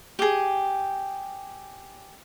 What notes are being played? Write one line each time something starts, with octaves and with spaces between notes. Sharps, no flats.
G4 G#4